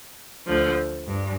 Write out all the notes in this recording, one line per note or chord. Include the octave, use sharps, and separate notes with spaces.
D2 D3 F3
G2